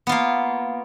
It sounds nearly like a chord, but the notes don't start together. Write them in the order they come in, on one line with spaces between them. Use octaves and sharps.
B3 F4 A#3